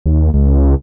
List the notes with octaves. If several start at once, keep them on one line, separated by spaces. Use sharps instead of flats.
D#2
C#2